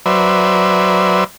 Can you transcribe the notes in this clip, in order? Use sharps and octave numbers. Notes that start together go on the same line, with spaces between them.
F#3 B4 C5 D5 E5